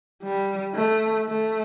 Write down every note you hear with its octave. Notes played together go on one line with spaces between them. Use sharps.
G3
A3
A3